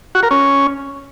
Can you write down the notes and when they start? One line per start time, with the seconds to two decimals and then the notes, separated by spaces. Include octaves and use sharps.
0.15 F#4
0.23 A#4
0.31 C#4